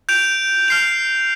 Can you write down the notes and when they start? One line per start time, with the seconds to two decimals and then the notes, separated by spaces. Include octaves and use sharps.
0.09 G6 D7 F7
0.68 F6 C7 F7